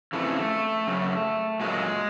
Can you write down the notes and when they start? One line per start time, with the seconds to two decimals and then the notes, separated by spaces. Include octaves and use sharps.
0.13 F2 C#3 E3 A3
0.87 F#2 C#3
1.60 A#2 F#3 G#3